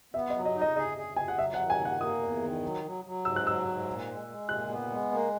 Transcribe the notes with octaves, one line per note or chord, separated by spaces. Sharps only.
B3 E5
D#5
F#3
D#5
D#4
D#5
G#4 D#5
G#4
G#4 G#5
F#5
F#3 E5
F#5
D#3
G#5
A#3
F#5
A#3 D#6
E2
D#3
F#3
F#3
F#3
G#2 E6
F#6
F#3 E6
G#2
A#2
G#3
G#3
A#2 F#6
B3
G#3
A#3